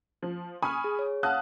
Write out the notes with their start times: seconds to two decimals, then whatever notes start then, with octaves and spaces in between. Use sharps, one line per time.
0.23 F3
0.62 G#5 B5 C#6 D#6 F6
0.84 G#4
0.99 C#5
1.23 F5 F#5 A5 D#6 F6 F#6